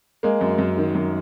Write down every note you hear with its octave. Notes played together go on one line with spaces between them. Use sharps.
G#3 A#3
F#2
F#2
D#3
F#2